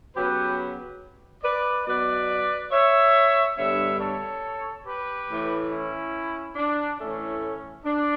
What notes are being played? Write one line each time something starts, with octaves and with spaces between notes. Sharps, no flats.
C#3 F#3 B3 G4 B4
B4 D5
B2 F#3 B3 B4 D5
C#5 E5
G2 D3 G3 B3 C#5 E5
A4 C#5
G4 B4
A2 E3 A3
C#4 E4
D4
A2 E3 A3 C#4
D4